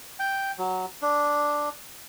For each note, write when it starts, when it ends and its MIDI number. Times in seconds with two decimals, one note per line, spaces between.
0.19 0.51 79
0.58 0.86 54
1.02 1.69 62